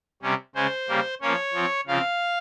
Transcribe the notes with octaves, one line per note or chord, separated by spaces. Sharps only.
C3 G3 C#4
C#3 G#3 C#4 C5
C#3 G3 A#3
F3 A#3 C#4 C#5
F3 C4
C#3 F3 C4 F5